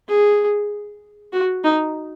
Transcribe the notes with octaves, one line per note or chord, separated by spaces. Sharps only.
G#4
F#4
D#4